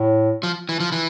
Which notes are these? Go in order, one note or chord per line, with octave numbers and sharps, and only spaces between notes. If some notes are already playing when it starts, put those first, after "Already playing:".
Already playing: A2
F3
E3
F3
E3